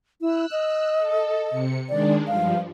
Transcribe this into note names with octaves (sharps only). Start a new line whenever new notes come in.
E4 E6 F#6
D#5
A4
C3 C#7
D#3 G#3 D4 D5
G2 F3 F5